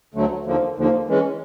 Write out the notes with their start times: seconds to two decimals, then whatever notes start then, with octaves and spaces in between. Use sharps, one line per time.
0.14 D2 D3 F#3 A3
0.45 D#2 D3 F3 A#3
0.75 D#2 D3 F3 A#3
1.07 E3 G#3 C#4